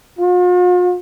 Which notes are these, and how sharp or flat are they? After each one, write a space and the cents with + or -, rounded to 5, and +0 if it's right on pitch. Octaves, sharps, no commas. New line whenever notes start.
F4 +45